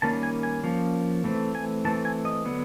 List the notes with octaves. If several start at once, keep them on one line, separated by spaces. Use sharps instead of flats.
D#3 G3 A#3 C#4 A5
G#5
G#5
F3 A#3 C#4
E3 A3 C4
G#5
E3 A3 C4 A5
G#5
D#5
D3 F#3 B3